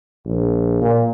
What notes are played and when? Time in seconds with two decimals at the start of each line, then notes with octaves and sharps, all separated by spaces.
0.25 A#1
0.82 A#2